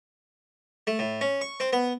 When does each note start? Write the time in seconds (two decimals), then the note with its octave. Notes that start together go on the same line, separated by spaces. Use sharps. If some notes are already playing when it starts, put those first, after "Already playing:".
0.87 A3
0.99 A2
1.21 C#4
1.41 C#6
1.60 C4
1.73 B3